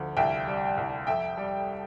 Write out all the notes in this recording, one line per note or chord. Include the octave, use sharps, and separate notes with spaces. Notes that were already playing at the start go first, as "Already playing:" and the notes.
Already playing: D2 F3
C2 E5 G5
G3
C2
F2 E5 G5
G3